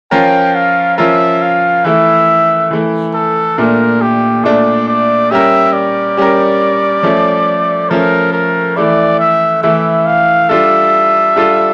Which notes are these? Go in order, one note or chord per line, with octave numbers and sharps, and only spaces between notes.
F3 C#4 F4 A#4 G5
F5
F3 C#4 F4 A#4 E5
F5
E3 A3 E4 E5
E3 A3 E4
A4
A#2 A3 D4 A#4
G4
A#2 A3 D4 D5
D5
G3 C#4 G4 A#4 E5
D5
G3 C#4 G4 A#4
F3 A3 C#4
F3 A3 C#4 A#4
A#4
E3 A3 E4 D5
E5
E3 A3 E4 E5
F5
G3 D4 F4 A4 E5
G3 D4 F4 A4